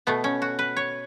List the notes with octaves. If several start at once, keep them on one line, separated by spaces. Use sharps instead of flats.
B2 A3 B3
C#4
F#4
B4
C#5